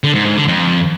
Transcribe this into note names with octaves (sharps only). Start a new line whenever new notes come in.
D3
G#2
G#2
D3
F2